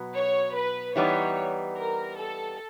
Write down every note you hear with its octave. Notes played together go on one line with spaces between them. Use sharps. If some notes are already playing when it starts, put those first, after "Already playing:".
Already playing: B2 F#3 B3
C#5
B4
E3 G3 B3 D#4 C#5
A#4
A4